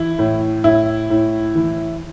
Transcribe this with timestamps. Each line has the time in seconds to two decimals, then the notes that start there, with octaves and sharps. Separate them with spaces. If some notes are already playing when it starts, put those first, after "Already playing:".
Already playing: E3 E4
0.19 A2
0.64 A2 E4
1.10 A2
1.55 E3